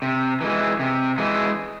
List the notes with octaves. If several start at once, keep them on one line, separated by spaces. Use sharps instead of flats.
C3
E3 G#3
C3
E3 G#3